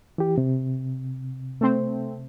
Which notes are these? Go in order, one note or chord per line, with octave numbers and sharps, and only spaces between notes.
E3 G4
C3
A3 C4